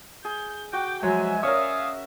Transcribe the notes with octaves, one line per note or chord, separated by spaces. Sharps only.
G#4 G6
F#4 G5 D6
F3 F#3 G#3 C5 E5 F#5 G#5
C#4 A#4 C#5 D5 F5 D#6